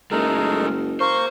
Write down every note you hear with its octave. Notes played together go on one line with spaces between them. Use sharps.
F#1 G#3 A3 D#4 A4 A#4
A#3 A#4 C5 C#6